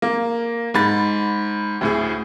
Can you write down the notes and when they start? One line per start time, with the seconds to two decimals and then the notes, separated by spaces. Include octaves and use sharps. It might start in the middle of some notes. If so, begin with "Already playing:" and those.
0.02 A#3
0.74 G#2 B5 A6
1.81 D2 A2 G#4